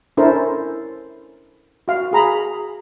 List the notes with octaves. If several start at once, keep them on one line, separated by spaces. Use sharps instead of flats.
C#4 D4 E4 A4 A#4 C5
F#4 F5
F#4 G#4 A#5 B5